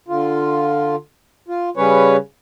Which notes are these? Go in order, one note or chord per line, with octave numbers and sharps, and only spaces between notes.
D3 F4
F4
C#3 G3 C#4 B4 C#5